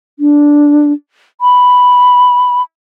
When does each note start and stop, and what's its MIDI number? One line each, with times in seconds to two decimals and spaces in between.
0.19 0.92 62
1.41 2.62 83